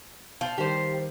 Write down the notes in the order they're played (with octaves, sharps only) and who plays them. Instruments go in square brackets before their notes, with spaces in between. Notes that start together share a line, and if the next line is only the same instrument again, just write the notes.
[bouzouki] F3
[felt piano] D#3 G3 [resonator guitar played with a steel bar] G4 C5